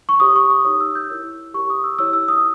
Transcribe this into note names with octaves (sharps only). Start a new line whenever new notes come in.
C#6
G4 C#5 D#6
C#6
D#6
D#4 G4 C#5 D#6
E6
G6
E4 A#4 C#5 E6
G4 A#4 C#5 C#6
D#6
E6
E4 G4 C#5 E6
E6
D#6